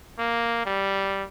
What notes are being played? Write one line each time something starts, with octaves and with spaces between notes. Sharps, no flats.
A#3
G3